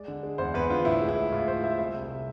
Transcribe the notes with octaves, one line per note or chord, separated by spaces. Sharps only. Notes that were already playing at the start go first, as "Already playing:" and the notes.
Already playing: G#3 D5
D3
G#3
E2 C5
E2 B4
D3 F4
A2 E4
G#3
E4
G#3
A2 F4
A2 C5
G#3 E5
C2 E5
C2
C3